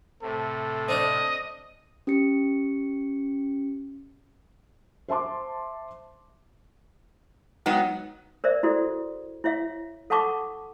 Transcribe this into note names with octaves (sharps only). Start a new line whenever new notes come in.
A2 C3 A4
C4 D4 C5 D#5
C#4 G4 C#7
C5 E5 A5 C6 D6
F#3 G#3 B3 D#4 F#5 G5
A#4 C5 D5 E5
E4 F#4 A4 D5
E4 C#5 E5 F5
A4 F5 F#5 A5 C#6 D6